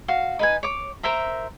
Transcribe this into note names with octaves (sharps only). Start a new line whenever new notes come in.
F#4 F5
D#4 B4 G#5
C#5 D6
A#4 C5 E5 A#5